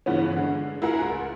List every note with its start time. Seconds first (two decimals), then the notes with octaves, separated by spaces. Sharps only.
0.06 G2 C#3 E3 B3 C#4
0.36 D3 G#3
0.82 E4 F#4 G#4 A#4 F#5 G#5
1.01 C#2